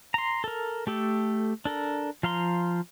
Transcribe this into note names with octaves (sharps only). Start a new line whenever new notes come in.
A#5 C6
A4 A#4
A3 G4 A4
D4 A4 A#4
F3 F5 A#5 C6